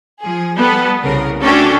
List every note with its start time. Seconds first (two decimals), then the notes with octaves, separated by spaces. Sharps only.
0.22 F3 G#4
0.58 G3 B3 A4
1.03 C2 C#3 A#4
1.42 A3 C#4 D4 F#4 A4 G5